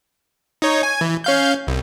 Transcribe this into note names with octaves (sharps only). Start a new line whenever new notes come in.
D#4 C#5
G#5
E3
C#4 F5 G6
C2